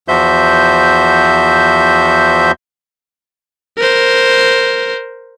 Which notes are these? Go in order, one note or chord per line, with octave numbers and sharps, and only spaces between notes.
E2 F3 F#4 C5 E5 G6
A#4 C5